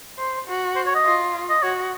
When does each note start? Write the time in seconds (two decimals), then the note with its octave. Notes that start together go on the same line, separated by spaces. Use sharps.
0.18 C5
0.47 F#4
0.76 C5
0.86 C#5
0.95 D#5
1.05 F4
1.50 D#5
1.63 F#4 C#5